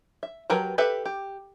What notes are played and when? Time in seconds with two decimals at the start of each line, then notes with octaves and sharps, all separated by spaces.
0.23 E5
0.50 F#3 G4 A#4 B4 A5
0.78 G4 A4 B4 E5
1.05 G4